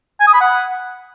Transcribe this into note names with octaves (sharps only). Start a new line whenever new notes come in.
G#5
D#6
B5
F#5